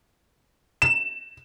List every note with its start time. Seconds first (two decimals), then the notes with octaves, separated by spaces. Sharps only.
0.82 E7